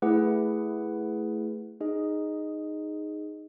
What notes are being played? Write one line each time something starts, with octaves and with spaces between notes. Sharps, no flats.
A3 E4 G#4 B4 F#5
D#4 G#4 D#5